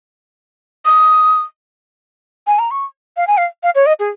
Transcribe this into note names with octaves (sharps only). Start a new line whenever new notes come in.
D#6
G#5
A#5
C#6
F5
G#5
F5
F5
C#5
D#5
G#4